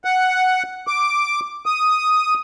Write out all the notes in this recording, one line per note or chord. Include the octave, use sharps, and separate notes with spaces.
F#5
D6
D#6